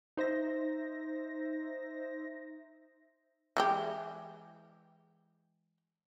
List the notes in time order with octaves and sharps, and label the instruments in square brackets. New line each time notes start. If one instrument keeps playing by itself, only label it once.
[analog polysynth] D#4 C5 E5 A#6
[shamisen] E3 G#3 G4